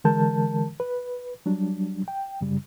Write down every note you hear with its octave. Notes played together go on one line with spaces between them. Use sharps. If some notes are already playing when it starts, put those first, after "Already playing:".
D3 E3 G#3 A#4 A5 G6
B4
F#3 G3 D4
G5
F#2 C#3 G3